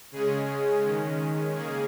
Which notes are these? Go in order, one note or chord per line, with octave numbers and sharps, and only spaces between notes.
C#3 G#3 C#4 G#4
D#3 G#3 C#4
C#3 A#3 C#4 G#4